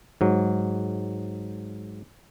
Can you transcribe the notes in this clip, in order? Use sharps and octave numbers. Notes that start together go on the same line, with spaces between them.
G#2 F#3